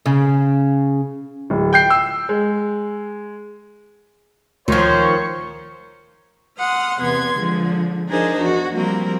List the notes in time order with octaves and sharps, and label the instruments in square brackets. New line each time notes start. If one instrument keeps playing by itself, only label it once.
[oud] C#3
[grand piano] D1
G5 G6 C7
E6
G#3
[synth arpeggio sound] D2 [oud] D#3 F3 [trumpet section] C5 C#5 [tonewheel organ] C#6
[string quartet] F#5 C6 D#6 F6
E2 C3 B3 C6 G#6
D3 F3 G#3
F3 D4 D#4 G#4 A#4 C5
E2 F#4
F3 G3 A#3 C4 A#4